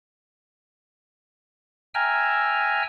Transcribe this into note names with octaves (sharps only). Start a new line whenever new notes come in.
E5 G5 G#5 A#5 E6 F6